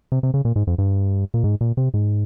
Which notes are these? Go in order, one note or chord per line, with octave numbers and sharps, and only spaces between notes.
C3
C3
C#3
A#2
G#2
F2
G2
A#2
G#2
A#2
C3
G#2